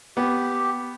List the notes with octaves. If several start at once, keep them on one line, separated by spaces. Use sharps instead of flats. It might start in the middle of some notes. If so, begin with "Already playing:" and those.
B3 G4